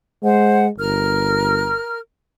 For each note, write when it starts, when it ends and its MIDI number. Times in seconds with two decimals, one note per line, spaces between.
0.23 0.69 56
0.23 0.66 72
0.23 0.66 78
0.78 1.76 31
0.78 1.98 70
0.78 1.98 89